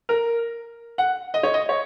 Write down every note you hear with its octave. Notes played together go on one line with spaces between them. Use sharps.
A#4
F#5
D#5
C#5
D#5
C#5